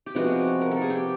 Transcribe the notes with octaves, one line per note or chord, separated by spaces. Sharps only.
G4
C3 F3 G#3 B3 F#4
A#4
A4
G#4
G4